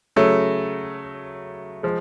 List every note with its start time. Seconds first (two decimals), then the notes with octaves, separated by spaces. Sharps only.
0.16 C#3 F#3 A3
1.83 F3 G#3